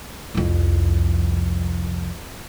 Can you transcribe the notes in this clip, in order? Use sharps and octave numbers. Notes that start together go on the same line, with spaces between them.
C2 F2